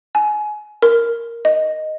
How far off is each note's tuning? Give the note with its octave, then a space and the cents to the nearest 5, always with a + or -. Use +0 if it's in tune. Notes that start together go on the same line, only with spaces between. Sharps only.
G#5 +25
A#4 +0
D#5 -5